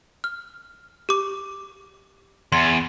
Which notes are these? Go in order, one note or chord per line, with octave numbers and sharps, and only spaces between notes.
F6
G4 D6
E2 C6